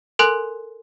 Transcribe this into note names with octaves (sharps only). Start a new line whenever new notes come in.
A4 A#4 G#5 C6 F#6